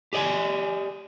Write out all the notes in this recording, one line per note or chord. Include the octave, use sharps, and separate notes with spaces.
G4 G#4 D5 D#5 G#5